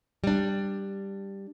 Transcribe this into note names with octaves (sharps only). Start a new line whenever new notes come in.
G3 D4